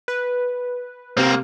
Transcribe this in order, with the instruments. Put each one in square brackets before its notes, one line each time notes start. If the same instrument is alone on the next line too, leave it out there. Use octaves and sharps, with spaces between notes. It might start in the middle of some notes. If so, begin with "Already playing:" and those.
[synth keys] B4
[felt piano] C3 [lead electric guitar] A#3 C4